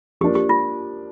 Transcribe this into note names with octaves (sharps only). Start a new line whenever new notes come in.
F3 A#3 D4 G4
G4
F4